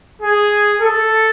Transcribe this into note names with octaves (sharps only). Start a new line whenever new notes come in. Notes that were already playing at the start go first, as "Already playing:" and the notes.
G#4
A4